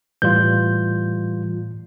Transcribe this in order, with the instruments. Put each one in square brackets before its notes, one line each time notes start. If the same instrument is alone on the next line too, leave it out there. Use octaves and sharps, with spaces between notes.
[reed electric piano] A2 G6 [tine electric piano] E3 G3 F4